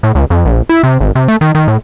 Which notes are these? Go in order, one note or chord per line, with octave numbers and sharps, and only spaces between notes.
A2
C#2
F2
A#1
E4
C3
G#1
C3
A3
D#3
D#3
A2